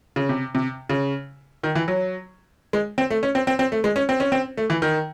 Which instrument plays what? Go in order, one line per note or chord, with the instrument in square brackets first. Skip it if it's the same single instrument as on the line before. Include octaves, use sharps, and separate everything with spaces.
[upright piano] C#3
C3
C3
C#3
D#3
E3
F#3
G#3
C4
A3
C#4
C4
C4
C4
A3
G#3
C#4
C4
C#4
C4
A3
E3
D#3